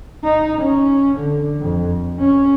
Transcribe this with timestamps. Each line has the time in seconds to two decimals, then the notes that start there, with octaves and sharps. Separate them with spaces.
0.24 D#4
0.62 C#4
1.18 D3
1.61 F2
2.19 C#4